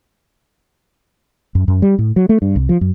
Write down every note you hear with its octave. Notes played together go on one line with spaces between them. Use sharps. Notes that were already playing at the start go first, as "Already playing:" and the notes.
F#2
F#2
G3
A2
F#3
A3
G2
C2
F3
F#2